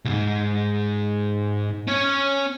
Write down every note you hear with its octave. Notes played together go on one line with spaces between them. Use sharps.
C2 G#2
C#4 C#5